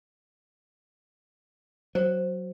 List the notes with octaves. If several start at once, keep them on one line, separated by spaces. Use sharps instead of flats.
F#3 C5 C#5